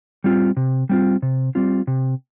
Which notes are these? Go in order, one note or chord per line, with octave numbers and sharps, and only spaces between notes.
G3 C4 F4
C3
G3 C4 F4
C3
G3 C4 F4
C3